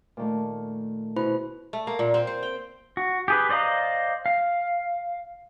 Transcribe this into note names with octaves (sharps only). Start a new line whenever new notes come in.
A#2 D#3 A3
B2 E4 C5 B5
A3
A#3
A#2
C4
C5
G5
F#4
G4 G#4 B4
C5 D5 D#5 F5 A#5
F5